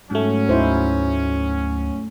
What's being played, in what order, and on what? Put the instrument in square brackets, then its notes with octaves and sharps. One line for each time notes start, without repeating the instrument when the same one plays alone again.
[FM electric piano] G#2 A3 [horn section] F#3 C#4
[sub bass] D2 [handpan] D#4 E4 C5